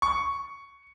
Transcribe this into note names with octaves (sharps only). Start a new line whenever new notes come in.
C#6